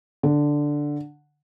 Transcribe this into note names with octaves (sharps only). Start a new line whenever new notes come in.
D3